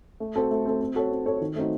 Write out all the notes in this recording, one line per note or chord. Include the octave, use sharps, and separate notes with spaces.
A3
C4 F#4 A4
A3
C4 F#4 A4
C4
F#4 A4 C#5
C4
F#4 A4 C#5
D#3
A3 C4 D#4 F#4